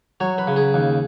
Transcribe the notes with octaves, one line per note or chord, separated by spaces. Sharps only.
F#3 C#5
B4
C#3
G#4
D#2